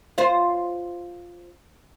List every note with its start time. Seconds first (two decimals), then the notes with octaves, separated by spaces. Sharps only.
0.18 F4 C5